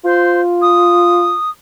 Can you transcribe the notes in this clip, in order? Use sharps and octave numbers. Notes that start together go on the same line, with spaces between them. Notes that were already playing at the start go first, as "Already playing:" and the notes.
F4 C5
D#6